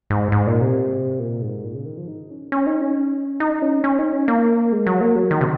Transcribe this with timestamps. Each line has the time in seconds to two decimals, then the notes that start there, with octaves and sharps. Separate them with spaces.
0.10 G#2
0.32 G#2
0.47 A#2
0.62 C3
1.20 A#2
1.42 G#2
1.64 A#2
1.74 C#3
1.86 D#3
1.98 F3
2.08 D#4
2.30 C#4
2.52 C#4
2.67 D#4
2.81 C#4
3.40 D#4
3.62 C#4
3.84 C#4
3.99 D#4
4.13 C#4
4.28 A#3
4.72 G#3
4.87 F#3
5.01 A#3
5.16 F#3
5.31 D#3
5.41 C3